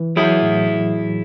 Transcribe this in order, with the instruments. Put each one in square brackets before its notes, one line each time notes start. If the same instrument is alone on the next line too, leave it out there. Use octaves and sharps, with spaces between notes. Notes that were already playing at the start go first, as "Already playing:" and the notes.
Already playing: [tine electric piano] E3
[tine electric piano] F#3 [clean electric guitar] E4 G#4
[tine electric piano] A2